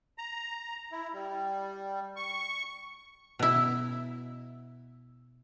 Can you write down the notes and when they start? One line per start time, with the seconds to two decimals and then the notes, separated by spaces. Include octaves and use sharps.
0.18 A#5
0.92 E4
1.13 G3
2.16 C#6
3.39 B2 E4